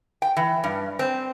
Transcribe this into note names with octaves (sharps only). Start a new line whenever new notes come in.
G5
E3
G2
C4